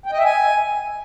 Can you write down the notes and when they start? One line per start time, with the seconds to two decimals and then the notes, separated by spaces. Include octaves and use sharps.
0.06 G5
0.12 D#5
0.18 E5
0.24 G#5